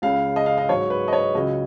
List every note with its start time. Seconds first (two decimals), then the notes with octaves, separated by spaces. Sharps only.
0.02 C#2 C#3 G#3 F5
0.36 D#5
0.46 F5
0.58 D#5
0.69 G#2 F#3 C#5
0.90 B4
1.08 D#5
1.13 C#5
1.35 C#2 C#3 F#3 D#5